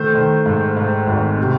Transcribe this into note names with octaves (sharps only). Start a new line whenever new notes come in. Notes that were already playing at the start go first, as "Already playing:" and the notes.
Already playing: D#3 A3 C5
D#3
G#2
G#2
G#1
C3